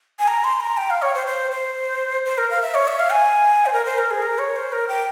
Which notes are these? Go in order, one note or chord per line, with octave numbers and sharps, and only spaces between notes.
G#5
A#5
C6
A#5
G5
F5
C#5
C5
C5
C5
C5
A#4
F5
E5
C#5
E5
F5
G#5
C5
A#4
C5
A#4
G#4
A#4
C#5
C5
A#4
G5